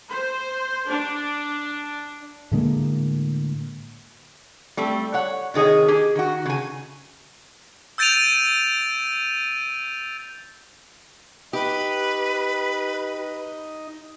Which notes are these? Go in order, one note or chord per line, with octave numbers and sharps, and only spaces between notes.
C5
D4
A2 D3 G#3 A#3
G3 A3 C4
C#5 F#5
C3 D#3 G#4 C#5 D#5
G4 G#4
D#3 F#4
C#3 G#5
E6 G6 A6 D7 D#7 F7
D#4 G4 B4 D#5